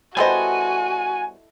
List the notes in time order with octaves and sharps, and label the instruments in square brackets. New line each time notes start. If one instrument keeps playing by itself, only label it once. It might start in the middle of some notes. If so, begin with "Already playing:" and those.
[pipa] G3 B3 C5 [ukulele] E4 A4 D#5 [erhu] F#4 [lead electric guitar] G#5